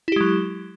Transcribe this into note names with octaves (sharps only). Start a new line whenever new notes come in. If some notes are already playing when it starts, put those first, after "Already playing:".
F#3 G#3 E4 G4